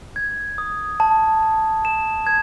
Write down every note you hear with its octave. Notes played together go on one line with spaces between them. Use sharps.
G#6
D#6
A5
A5
E7
G#6